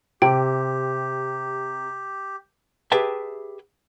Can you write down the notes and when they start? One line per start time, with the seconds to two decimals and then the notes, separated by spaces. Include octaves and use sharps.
0.22 C3 G4 G5
2.92 G4 G#4 B4 E5 G5 A5